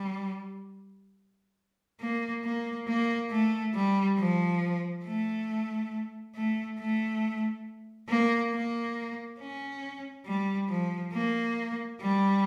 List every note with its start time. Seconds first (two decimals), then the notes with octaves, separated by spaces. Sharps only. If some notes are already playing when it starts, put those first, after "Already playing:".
Already playing: G3
2.00 A#3
2.45 A#3
2.87 A#3
3.31 A3
3.74 G3
4.18 F3
5.05 A3
6.36 A3
6.79 A3
8.09 A#3
8.53 A#3
9.40 C#4
10.26 G3
10.70 F3
11.13 A#3
12.01 G3